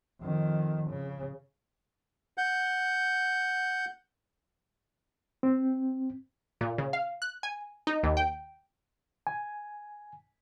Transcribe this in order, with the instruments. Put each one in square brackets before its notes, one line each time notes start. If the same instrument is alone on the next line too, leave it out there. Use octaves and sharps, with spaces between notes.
[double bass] F2 D#3
C#3
[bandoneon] F#5 G6
[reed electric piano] C4
[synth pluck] A#2
C#3
F5
F#6
G#5
D#4
D#2
G5
[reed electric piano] G#5